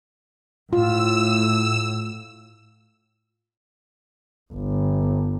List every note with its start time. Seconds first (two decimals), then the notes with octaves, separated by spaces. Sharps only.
0.73 A2 F4 E6
4.53 G1